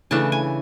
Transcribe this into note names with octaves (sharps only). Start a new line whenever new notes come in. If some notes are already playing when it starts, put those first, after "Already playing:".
C#3 E3 A3 D4 A5
G#5